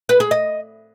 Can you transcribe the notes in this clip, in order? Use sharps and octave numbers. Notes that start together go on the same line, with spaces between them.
B4
G#4
D#5